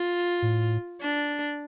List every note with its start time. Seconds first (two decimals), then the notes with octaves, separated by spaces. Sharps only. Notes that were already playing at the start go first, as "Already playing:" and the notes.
Already playing: F4
0.42 A2
1.02 D4